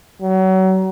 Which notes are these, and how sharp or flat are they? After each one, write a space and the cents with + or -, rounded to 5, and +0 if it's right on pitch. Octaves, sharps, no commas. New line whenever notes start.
F#3 +30